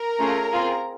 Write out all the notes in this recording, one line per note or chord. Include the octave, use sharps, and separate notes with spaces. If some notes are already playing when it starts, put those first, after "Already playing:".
Already playing: A#4 A#5
A3 C#4 F4 G#4
C4 F4 G#4